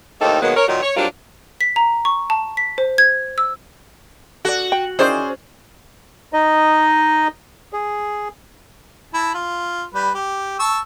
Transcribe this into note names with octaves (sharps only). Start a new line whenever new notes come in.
D#2 A2 A#3 C4 D#4 A4
B2 D#3 F#3 G#3 A#3 B3
A#4 C#5
A#2 D#3 F#3
C#5
F#3 G3 C4 D4 F4 A#4
B6
A#5
C#6
A5
B6
C5
G#6
E6
F#4 A4 D5
G5
D#3 E3 C#4 G#4 C5 D5
D#4 D#5
G#4
E4 A5
F4
G3 B4
G4
A5 C#6 E6